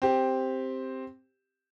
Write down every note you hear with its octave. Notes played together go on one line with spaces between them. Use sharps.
C4 G4